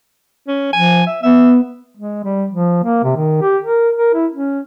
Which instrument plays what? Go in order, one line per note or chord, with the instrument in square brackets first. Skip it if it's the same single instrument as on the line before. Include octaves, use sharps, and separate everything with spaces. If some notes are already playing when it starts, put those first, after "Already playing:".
[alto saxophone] C#4
[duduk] F3 [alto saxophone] G#5
[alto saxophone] E5
[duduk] B3 [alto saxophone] E5
[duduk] G#3
G3
F3
A#3
C3
D#3
G4
A#4
A#4
E4
C#4